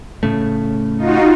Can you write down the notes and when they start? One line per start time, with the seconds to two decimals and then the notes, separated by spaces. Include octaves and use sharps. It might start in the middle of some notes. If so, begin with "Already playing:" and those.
0.23 A2 C#3 A3
0.97 D#4 F4 F#4